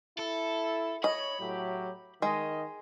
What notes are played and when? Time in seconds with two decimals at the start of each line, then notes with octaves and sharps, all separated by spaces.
0.19 E4 A4
1.04 C#5 D#5 B5
1.40 A2 F#3 G4
2.22 D#3 G#3 D#5